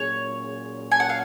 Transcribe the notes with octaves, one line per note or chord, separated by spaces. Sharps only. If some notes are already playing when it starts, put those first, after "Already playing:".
Already playing: A#2 F#3 C#4 G#4 C#5
G#5
F#5
F5